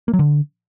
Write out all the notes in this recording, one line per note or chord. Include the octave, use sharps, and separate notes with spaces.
A#3
F#3
D3